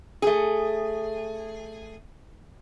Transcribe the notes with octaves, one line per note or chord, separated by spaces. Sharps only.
A3 G#4